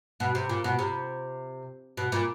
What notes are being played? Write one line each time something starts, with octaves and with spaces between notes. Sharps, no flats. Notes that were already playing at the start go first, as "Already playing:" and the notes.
B2
C3
A#2
B2
C3
B2
A#2